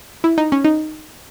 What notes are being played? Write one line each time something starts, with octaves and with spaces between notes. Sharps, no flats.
E4
D#4
C#4
D#4